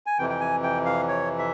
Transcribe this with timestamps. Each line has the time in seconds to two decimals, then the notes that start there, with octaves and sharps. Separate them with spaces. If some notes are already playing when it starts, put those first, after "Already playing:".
0.06 G#5
0.19 F2 C3 E3 G5
0.30 G5
0.41 G#5
0.63 G5
0.86 F5
1.08 C#5
1.39 E5